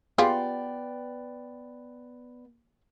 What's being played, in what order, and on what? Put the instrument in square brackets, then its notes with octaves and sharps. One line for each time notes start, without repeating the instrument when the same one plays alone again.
[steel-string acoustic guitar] B3 D5 G5 [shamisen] F4 G4 G#4